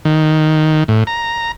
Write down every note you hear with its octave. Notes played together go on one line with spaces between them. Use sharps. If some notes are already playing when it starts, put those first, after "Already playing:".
D#3
A2
A#5